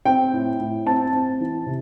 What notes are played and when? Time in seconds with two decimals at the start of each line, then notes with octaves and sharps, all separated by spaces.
0.06 C4 G5
0.33 A2
0.59 A2
0.86 C4 A5
1.13 C4
1.41 E3
1.66 C3